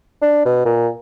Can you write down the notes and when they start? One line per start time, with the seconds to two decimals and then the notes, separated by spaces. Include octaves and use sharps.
0.22 D4
0.45 B2
0.65 A#2